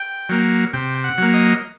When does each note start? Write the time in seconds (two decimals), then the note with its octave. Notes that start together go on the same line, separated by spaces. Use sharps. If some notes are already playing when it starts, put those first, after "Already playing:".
Already playing: G5
0.29 F#3 A#3
0.73 C3 G5
1.04 F#5
1.18 F#3 A#3
1.34 D#5